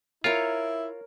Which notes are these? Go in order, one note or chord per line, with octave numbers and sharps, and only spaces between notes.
E4 F4 A#4 C#5 A#5